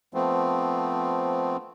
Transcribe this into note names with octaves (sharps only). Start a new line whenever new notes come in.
F3 A3 B3 C4